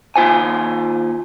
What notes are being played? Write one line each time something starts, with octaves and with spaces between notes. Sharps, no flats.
D#2 F4 C5 G#5